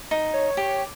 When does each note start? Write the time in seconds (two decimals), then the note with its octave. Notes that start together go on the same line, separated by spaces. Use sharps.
0.11 D#4
0.33 C#5
0.57 G4